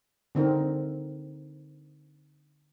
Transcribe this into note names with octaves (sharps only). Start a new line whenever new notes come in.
D3 C4 D#4 A#4